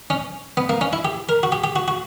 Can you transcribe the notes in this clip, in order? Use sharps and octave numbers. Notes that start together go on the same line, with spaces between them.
C#4
B3
A#3
C#4
E4
G4
A#4
F#4
G4
G4
F#4
F#4